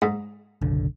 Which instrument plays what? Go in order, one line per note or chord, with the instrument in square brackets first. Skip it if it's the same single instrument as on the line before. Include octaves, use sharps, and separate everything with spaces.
[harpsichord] G#2
[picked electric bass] F#1 B1 D3